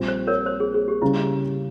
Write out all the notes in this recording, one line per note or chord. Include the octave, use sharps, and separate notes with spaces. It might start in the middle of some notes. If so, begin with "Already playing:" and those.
Already playing: A#1 A#2 G3 C4
C5
A#4 C#5
C5
G#4
G#4
G4
C#3 G3 C#4 E4